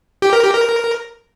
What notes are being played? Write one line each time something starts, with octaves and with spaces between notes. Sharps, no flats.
G4
A#4
G4
A#4